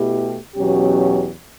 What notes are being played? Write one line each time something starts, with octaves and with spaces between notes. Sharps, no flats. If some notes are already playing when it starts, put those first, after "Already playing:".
Already playing: B2 A3 E4 G4
E2 B2 F#3 C#4 G4